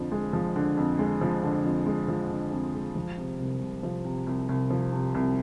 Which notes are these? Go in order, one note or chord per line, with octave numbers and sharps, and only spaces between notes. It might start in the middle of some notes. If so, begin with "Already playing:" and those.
Already playing: F2 D3 F3
G#3
F3
D3
F2
G#3
F3
D3
F2
G#3
F3
D3
F2
G#3
F3
C3
C2
C2
F3
C3
C2
C2
F3
C3
C2